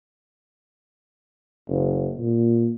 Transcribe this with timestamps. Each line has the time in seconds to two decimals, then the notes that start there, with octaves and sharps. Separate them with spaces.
1.69 F#1
2.19 A#2